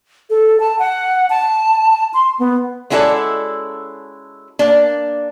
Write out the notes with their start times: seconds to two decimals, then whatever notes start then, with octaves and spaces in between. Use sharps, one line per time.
0.30 A4
0.60 A5
0.79 F#5
1.30 A5
2.14 C6
2.40 B3
2.90 G#3 C#4 E4 F#4 A4 D5
4.59 A#3 D4